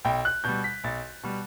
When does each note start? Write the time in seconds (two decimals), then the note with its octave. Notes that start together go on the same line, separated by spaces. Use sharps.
0.05 B1 G5
0.25 F#6
0.44 B2 G3 G6
0.64 B6
0.84 B1 A6
1.23 B2 G3